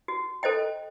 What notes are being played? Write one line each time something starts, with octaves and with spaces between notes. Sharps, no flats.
F#4
A4 C5 D#5 G5